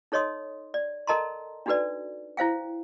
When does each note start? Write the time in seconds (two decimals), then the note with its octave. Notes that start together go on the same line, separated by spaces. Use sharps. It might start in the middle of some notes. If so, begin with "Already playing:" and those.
0.12 D#4 A4 C#5 D#5 C6 D#6
0.74 D5
1.07 A4 A#4 D#5 A5 A#5 C6
1.66 D4 D#4 F#4 A4 B4 D5
2.37 E4 C5 F5 G5